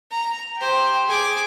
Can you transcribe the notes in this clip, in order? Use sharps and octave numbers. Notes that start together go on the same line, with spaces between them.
A#5
G4 C5
G#4 D6